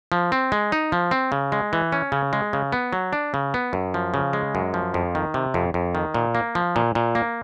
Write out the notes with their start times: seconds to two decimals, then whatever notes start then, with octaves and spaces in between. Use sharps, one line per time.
0.12 F3
0.32 C4
0.52 G#3
0.72 D#4
0.92 F3
1.11 C4
1.32 C#3
1.52 G#3
1.73 E3
1.92 C#4
2.12 C#3
2.33 G#3
2.53 C#3
2.72 B3
2.93 F#3
3.13 D4
3.34 C#3
3.54 B3
3.73 F#2
3.94 F3
4.14 C#3
4.33 G#3
4.55 F#2
4.74 F3
4.94 F2
5.15 D#3
5.34 C3
5.54 F2
5.74 F2
5.95 D#3
6.14 A#2
6.35 A#3
6.55 F3
6.76 A#2
6.95 A#2
7.15 A#3